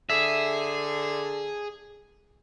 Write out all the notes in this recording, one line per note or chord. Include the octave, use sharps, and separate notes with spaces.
D3 G#4 E5